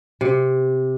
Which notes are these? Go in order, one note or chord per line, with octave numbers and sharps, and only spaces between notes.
C3